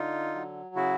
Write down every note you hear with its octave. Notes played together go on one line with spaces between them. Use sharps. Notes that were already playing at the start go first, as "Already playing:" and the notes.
Already playing: D3 D#4 F4
F#3
C#3 E4 F#4